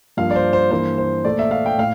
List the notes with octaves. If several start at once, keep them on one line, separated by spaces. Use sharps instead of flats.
G2 F3 A#3 F5
D5
C5
C5
G2 E3 A#3 C5
C5
A#2 A3 D5
E5
F5
G5
A2 F5